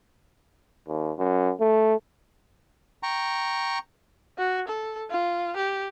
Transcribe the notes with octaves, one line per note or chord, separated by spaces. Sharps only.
D#2
F#2
A3
G5 A#5 C#6
F#4
A4
F4
G4